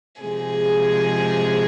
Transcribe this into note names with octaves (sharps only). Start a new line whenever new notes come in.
C3 F3 G#3 G#4